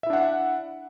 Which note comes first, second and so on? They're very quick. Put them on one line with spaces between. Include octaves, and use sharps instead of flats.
E5 E4 D4 F#5